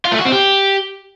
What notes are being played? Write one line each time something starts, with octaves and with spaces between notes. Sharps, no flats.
F4
A3
F#4
C4
G4